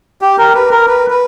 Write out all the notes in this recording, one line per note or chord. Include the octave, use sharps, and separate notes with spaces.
G4
A#4
B4
A#4
B4
B4